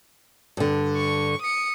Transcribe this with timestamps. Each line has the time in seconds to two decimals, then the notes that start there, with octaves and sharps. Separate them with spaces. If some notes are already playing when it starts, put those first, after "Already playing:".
0.57 G2 D3
0.96 C#6
1.41 D#6 C#7